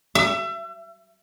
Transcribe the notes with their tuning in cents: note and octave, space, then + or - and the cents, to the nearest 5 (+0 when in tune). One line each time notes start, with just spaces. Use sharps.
E5 +30